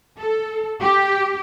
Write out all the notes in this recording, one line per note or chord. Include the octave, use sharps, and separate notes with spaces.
A4
G4